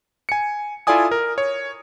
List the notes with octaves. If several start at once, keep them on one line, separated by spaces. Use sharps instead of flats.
G#5 C#7
E4 F4 A4 D5 G#5 D#6
A#4
C#5